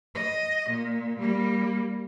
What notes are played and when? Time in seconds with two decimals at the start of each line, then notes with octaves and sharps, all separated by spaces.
0.15 D#5
0.70 A#2
1.20 G3 A#3